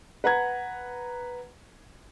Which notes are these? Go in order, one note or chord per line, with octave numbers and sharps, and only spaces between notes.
B4 F#5 A#5 G#6